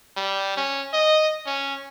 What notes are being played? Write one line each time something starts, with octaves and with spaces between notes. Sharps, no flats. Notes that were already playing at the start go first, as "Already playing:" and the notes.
G3
C#4
D#5
C#4